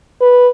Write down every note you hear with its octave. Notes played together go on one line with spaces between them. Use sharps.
B4